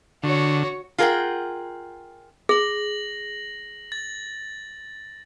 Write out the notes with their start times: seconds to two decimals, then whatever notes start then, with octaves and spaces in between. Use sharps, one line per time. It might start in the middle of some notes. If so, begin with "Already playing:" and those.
0.23 D3 F#4 C#5
0.98 F4 G#4 A#4 D#5 F#5 G5
2.49 G#4 A#6 F#7
3.92 A6